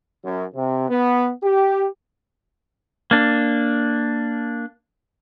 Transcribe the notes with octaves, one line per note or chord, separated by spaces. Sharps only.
F#2
C3
B3
G4
A#3 D4